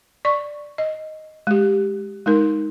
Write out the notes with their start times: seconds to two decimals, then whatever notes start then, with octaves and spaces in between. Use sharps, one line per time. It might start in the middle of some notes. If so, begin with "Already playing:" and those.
0.25 D5 C#6
0.78 D#5
1.47 G#3 G4
2.26 G#3 D#4 A#4